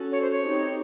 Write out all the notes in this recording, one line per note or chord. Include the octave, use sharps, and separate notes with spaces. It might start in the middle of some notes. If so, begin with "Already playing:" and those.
Already playing: C#4 F#4 A4
C#5
C5
C#5
C4 D#4 G4